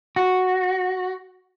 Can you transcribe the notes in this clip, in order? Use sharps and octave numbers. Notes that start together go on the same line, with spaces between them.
F#4